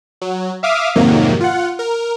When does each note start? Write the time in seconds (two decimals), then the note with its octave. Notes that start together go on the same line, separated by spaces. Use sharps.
0.22 F#3
0.63 E5 F5 D6 D#6 F6
0.95 F2 G#2 C3 D#3 F#3 A#3
1.40 F4 F#5
1.79 A#4